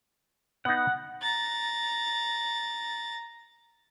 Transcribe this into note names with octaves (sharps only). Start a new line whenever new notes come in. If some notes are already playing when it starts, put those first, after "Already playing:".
B3 D#4 F#5
A#5 A6